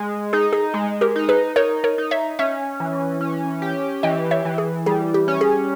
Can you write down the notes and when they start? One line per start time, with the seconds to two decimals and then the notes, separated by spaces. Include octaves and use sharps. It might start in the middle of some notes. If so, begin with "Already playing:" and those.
Already playing: G#3
0.33 D#4 G#4
0.53 G#4
0.74 G#3 G#4
1.01 G4 A#4
1.16 D#4
1.29 G#4 B4
1.56 D#4 A#4 C#5
1.84 A#4 C#5
1.98 D#4
2.11 C#5 E5
2.39 C#4 C#5 E5
2.80 E3
3.21 C#4
3.62 G4
4.03 E3 D#5 G5
4.31 C#5 E5
4.45 E3
4.58 G#4
4.86 G3 G#4
5.14 G4
5.28 C#4
5.41 G#4